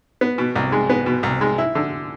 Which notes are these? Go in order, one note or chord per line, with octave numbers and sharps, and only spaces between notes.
B3
B2
C2
G#3
B3
B2
C2
G#3
E4
D3